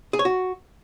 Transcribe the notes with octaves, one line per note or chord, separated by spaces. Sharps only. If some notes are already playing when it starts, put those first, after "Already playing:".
G#4
C#5
F#4